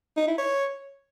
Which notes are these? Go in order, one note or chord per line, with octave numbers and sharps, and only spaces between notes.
D#4
E4
C#5